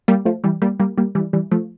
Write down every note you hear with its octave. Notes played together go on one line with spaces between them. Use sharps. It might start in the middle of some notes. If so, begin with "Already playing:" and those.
G3 A#3
F3 A3
E3 G3
G3 A#3
G3 A#3
G3 A#3
E3 G3
E3 G3
F3 A3